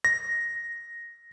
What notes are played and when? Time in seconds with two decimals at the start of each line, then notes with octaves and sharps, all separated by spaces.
0.05 A#6